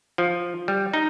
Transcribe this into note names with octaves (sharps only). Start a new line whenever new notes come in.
F3
G3
D#4